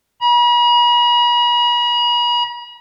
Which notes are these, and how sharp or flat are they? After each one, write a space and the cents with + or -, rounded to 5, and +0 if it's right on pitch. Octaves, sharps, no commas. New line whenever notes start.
B5 -45